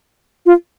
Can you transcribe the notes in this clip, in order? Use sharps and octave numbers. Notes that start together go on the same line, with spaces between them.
F4